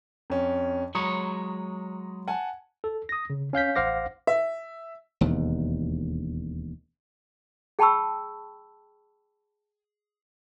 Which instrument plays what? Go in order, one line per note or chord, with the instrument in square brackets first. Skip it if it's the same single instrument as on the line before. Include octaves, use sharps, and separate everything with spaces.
[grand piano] F2 C#4
[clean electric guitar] F#3 G#3 C#5 [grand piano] A#5 B5 D#6
[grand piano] F#5 G#5 A5
[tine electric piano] A4
D#6 A#6
C#3
C#4 F5 G6 B6
A1 C5 F5 F#5 D6 A#6
[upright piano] E5
[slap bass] E1 D#2
[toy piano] G#4 G5 A5 B5 C#6 E6